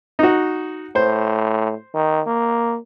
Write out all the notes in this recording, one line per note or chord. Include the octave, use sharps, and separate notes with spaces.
D#4 F#4
A2 C5
D#3
A#3